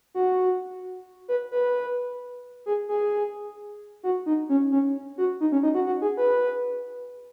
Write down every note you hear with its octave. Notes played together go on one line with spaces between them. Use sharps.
F#4
B4
B4
G#4
G#4
F#4
D#4
C#4
C#4
F#4
D#4
C#4
D#4
F#4
F#4
G#4
B4